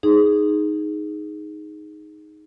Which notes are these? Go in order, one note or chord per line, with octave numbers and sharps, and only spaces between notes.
D#4 G#4